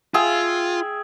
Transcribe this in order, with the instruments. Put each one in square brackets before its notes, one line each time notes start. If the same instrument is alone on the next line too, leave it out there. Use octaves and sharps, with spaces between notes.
[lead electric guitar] F4 [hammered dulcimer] G#4 E5 G5